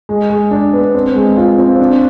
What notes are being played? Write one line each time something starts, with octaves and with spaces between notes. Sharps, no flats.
G#3
G#3
D4
B3
C4
G#3
F4
C4
D4